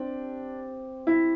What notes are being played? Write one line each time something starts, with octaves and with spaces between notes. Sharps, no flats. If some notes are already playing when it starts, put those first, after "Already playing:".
Already playing: C4 D4 G4
E4